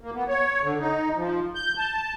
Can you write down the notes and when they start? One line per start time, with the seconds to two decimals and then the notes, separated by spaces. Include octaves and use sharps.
0.01 A#3
0.15 B3
0.28 C#5
0.63 D3
0.79 D#4
1.16 F3
1.55 G6
1.78 A5